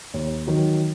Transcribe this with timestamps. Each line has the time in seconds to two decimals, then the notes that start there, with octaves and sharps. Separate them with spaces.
0.14 D#2
0.47 D#3 F#3